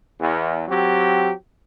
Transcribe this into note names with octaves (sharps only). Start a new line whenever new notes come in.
E2
F#3 C4 G4